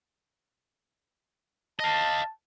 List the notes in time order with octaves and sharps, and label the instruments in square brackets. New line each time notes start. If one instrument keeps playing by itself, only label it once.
[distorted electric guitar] D#5 F5 [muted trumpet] A5